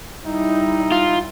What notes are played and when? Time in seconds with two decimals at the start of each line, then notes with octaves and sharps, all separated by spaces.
0.25 G3 D#4 E4
0.92 F4